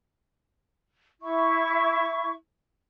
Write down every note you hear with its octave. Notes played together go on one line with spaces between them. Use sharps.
E4 E5 C#6